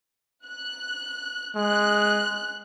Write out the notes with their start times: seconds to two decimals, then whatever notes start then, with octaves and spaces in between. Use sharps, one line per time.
0.46 F#6
1.55 G#3 F#6